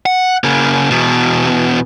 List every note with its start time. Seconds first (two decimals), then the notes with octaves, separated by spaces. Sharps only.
0.06 F#5
0.44 C#3 A#3
0.90 E2 B2